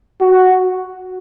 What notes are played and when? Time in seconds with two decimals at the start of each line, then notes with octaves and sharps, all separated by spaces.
0.21 F#4